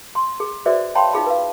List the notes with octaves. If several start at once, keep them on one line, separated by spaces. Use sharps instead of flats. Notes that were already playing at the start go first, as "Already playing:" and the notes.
C6
G#4
F#4 G#4 B4 C5 D5 E5
C#5 F5 G5 A5 B5 C6
D#4 F4 G#4 B5
B4 F5